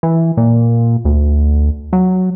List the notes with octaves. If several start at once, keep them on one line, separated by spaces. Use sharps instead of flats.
E3
A#2
D2
F#3